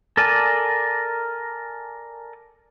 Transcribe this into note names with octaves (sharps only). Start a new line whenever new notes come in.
A4 A#4 D5 G#5 A5